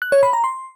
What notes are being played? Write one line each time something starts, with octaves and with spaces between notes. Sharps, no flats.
F#6
C#5
B5
A#5
C6